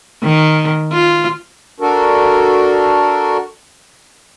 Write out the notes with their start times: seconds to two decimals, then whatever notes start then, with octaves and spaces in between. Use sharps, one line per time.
0.23 D#3
0.93 F4
1.80 D4 F#4 A4 A#4